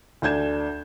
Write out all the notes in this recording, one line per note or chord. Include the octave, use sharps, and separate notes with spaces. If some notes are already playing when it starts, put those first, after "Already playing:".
D2 D4 G6 G#6 E7